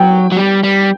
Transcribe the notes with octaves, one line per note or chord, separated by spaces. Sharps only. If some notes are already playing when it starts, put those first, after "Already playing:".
Already playing: F#3 G5
F#3
G3
G3